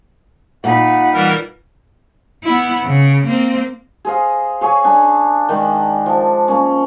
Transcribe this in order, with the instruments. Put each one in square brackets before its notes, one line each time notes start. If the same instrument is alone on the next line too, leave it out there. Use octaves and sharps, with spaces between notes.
[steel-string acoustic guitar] A#2 [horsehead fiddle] D#4 B5 [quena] F#5
[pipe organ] E3 G3 A#4
[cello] B3 E4
C#3
A#3 C4
[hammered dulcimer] G#4 C5 D#5 F5
G#4 C#5 F5 G#5
D4 G#5
D#3 G#3 D4
F3
A#3 C#4